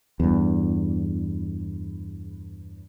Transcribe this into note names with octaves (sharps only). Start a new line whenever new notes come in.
E2 G2